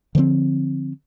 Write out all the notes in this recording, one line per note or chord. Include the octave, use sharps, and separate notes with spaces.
D3 F3 G3 C4